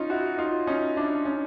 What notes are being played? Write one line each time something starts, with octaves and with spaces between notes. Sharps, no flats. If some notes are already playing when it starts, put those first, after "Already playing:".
Already playing: C#4 D#4 F4
E4 F#4
D#4 F4
C#4 D#4
D4 E4
C#4 D#4